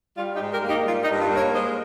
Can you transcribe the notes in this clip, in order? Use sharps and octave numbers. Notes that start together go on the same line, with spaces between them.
G3 F4
D#4 G4
G#2
G4 A#4
A#3
D#4 G4
G3 F4
D#4
G2
F4
A#3
A#4 C#5
G#3 C5 D#5